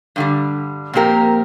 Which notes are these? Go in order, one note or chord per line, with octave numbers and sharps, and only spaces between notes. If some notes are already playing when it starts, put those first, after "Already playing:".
G2 D3 G3
A#2 F3 A#3 C4 G4 A#4